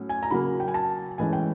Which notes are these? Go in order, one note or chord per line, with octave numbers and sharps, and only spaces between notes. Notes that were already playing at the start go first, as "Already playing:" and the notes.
Already playing: A2 F#3 C#4
G#5
A#5
C#3 F#3 A#3 B5
G5
G#5
A5
A2 E3 G#3 C#4 G#5
G5